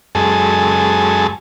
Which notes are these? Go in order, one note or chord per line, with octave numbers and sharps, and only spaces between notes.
F#2 G#3 G#4 A4 A5